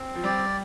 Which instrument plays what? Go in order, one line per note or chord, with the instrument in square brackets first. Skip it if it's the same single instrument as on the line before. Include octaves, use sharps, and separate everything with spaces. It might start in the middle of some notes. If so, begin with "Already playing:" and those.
Already playing: [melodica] C4
[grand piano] F3
[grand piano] G3 [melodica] D5